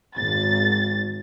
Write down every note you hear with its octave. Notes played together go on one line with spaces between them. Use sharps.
G#1 A6